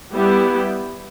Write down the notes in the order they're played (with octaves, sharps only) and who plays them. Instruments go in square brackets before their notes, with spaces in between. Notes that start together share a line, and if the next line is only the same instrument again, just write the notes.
[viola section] G3 B3 E4 G4